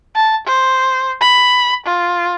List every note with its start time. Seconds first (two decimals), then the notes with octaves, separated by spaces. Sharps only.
0.15 A5
0.47 C5
1.20 B5
1.85 F4